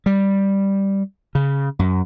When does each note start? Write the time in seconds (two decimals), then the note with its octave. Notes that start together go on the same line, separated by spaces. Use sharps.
0.06 G3
1.35 C#3
1.79 F#2